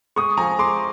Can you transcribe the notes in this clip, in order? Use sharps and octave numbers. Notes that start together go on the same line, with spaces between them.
G#3 C#6 D#6
F3 G#5 A#5
G#3 C6 D6